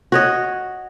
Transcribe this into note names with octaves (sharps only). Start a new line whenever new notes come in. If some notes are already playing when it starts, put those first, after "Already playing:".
F#4 C#5 D#5